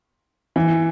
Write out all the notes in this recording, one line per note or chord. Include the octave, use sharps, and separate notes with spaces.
E3